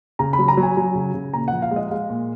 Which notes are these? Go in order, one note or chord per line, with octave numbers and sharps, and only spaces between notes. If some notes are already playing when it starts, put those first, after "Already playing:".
C#3 A#5
B5
F#3
A#5
F#3
G#5
F#3
C#3
C#3
A#2 A#5
F3 F#5
F5
G#3
D#5
G#3 F5
A#2